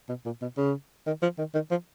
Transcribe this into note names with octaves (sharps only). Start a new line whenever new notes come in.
B2
A#2
B2
C#3
D#3
F3
D#3
D#3
F3